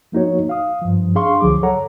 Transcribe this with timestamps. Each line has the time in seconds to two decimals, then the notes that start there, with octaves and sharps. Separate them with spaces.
0.12 F3 A#3 D#4 F#4 C#5
0.49 F5 D#6
0.82 G2 F3
1.15 D4 G#4 F5 C6 C#6
1.41 C#2 D3 F3 F#3 G#4 D6
1.63 A4 C#5 F#5 A#5